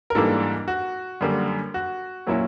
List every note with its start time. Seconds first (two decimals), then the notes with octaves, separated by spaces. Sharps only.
0.10 A#4
0.15 G#2 E3 G3 A#3 D4 A4
0.68 F#4
1.21 F#2 D3 G3 A#3
1.74 F#4
2.27 A#2 F#3 A#3 C#4 E4